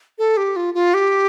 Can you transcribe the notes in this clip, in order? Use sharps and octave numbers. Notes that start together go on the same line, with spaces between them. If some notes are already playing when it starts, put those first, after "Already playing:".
A4
G4
F4
F4
G4